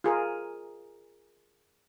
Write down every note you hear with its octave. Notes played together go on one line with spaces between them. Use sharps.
F4 G#4 A#4